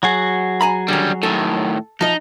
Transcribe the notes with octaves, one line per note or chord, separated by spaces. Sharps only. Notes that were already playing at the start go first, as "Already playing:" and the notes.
F#3 F#4 G#4
G#5 A#5 B5
D3 D#3 G3 C#4
A2 D#3 A4
F3 D#4 D#5